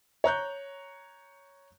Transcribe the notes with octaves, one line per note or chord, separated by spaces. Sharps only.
C#5 A#5 F#6 G6